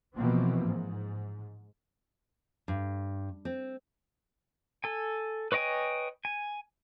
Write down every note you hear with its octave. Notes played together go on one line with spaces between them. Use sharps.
B2 E3 F3 A#3 C4
G#2
G2
C4
A4 G#5
B4 C#5 D#5 G5 G#5
G#5